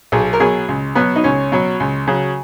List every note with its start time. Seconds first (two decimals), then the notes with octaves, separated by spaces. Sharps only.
0.12 B1 G#4
0.33 A#4
0.40 B2 F#3 G#4
0.68 C#2
0.95 B2 F#3 B3
1.16 D#4
1.24 C#2 C#4
1.52 B2 F#3
1.80 C#2
2.07 C#3 F#3